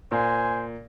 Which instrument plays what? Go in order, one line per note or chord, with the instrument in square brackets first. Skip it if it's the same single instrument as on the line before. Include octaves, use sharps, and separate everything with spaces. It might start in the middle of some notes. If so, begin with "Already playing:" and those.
[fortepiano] A#2 [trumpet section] C5 G#5